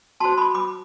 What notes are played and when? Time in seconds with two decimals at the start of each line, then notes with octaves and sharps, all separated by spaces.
0.20 F#4 C5 A5 C6
0.38 B5 D6
0.54 B5 D6